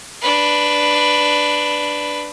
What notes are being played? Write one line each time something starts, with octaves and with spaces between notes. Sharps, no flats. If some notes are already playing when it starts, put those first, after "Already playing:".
D4 B4